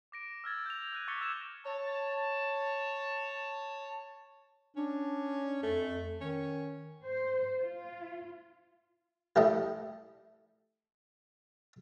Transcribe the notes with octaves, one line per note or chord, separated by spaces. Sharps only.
D6 A#6 D7
E6 F6 G#6 A6
G6 F7
E6 F#6 D#7
C#6 D6 A6 B6 C#7 G7
E6 G6 G#6 A#6 E7 F7
C#5 A5
C#4 D4
F2 A3
D#3 C#4
C5
F4
G3 A3 E4 A4 D#5